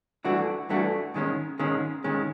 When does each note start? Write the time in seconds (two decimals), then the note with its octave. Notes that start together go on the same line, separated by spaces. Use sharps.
0.25 G2 E3 A3 D4 F#4
0.69 G2 E3 A3 D4 F#4
1.14 G#2 D#3 G#3 C#4
1.59 G#2 D#3 G#3 C#4
2.04 G#2 D#3 G#3 C#4